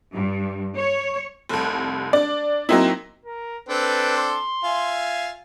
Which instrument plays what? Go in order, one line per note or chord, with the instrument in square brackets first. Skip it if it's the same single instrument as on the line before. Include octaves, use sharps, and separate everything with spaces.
[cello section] G2
C#5
[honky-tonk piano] F1 C2
D4 D5
F#3 A#3 C4 D#4 E4
[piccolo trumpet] A#4
[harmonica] C4 D4 A4 [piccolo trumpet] B4
[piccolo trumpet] C6
[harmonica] F4 E5 G#5